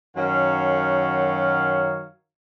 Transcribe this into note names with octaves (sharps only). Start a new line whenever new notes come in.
F#2 D#3 F#3 C#5 F5